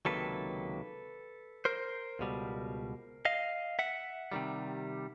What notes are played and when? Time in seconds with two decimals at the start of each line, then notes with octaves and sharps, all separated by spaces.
0.05 C#2 C3 D#3 F#3 A#3 A4 B4
1.65 A#4 C5
2.19 C#2 B2 G3
3.25 D#5 F5
3.79 E5 F#5
4.32 C3 D#3 G3